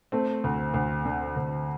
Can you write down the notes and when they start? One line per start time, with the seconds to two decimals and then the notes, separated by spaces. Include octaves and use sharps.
0.12 A3 C4
0.44 D2
0.74 D2
1.05 D3
1.36 D2